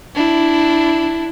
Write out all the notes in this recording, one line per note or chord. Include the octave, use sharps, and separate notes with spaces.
D4 E4